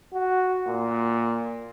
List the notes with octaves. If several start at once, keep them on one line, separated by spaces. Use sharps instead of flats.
F#4
A#2